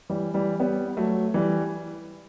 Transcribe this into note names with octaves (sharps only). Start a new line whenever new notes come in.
E3 G3
E3 G3
G3 B3
F#3 A3
E3 G3